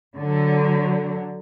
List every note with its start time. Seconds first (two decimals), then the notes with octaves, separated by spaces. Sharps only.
0.16 D3 F#3